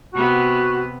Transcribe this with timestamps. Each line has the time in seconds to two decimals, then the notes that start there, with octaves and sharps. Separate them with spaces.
0.14 C3 B3 F#4